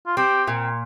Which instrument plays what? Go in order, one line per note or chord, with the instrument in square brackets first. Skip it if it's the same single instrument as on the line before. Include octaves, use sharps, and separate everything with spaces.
[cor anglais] F4
[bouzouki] C4 [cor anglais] G4
[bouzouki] A#2